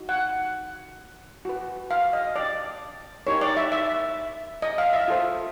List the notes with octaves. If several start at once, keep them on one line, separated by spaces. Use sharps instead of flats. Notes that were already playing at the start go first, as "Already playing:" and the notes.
Already playing: D#4 F#4
F#5
F#4 B4
F5
D#5
D5
D#4 G4 A#4 C#5
D5
E5
E5
D#5
F5
E5
F4 A4 C5